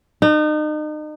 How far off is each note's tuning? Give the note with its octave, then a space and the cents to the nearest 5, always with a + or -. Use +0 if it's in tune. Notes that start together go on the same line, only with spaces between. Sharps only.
D#4 -35